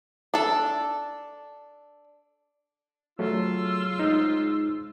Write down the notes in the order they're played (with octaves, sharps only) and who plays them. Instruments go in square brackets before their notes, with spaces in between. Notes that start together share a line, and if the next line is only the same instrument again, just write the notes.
[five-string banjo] D4 A4
[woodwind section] C#3 F4 E6 [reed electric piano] F#3 A3
[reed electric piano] G#3 D#4